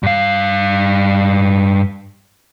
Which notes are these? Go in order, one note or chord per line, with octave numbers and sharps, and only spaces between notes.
G2 F5